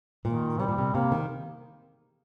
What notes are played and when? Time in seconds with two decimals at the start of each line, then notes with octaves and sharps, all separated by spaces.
0.25 A#2 D#3
0.59 C3 G3
0.68 A#2
0.78 C3
0.94 C3 A#3
1.12 D#3